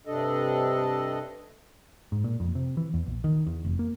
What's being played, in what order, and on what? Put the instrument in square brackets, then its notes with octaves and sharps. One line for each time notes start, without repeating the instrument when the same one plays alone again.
[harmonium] G2 C3 D4 A4 D#5
[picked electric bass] G#2
A#2
F2
C3
E3
E2
A#1
D#3
E2
F1
A#3